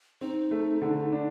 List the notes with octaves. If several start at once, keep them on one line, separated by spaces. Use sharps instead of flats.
C4 D#4
A3
D3
D4